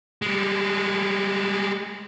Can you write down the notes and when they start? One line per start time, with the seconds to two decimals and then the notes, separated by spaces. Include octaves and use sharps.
0.22 G3 G#3